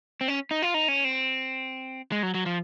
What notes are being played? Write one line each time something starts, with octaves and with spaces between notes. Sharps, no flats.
C4
C#4
D#4
F4
D#4
C#4
C4
G#3
F#3
F#3
F3